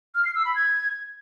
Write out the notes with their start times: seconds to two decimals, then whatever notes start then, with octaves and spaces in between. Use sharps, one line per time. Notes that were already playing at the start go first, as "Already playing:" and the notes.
0.15 F6
0.25 C7
0.35 E6
0.45 B5
0.55 G#6